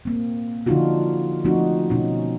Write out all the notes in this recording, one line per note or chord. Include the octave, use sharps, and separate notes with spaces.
A#3 C4
D3 F3 D4 D#4 F4 F#4
F3 A3 C4 D#4 F#4
B2 C#4 D#4